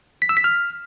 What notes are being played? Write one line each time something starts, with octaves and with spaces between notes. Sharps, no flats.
B6
E6
B6
F6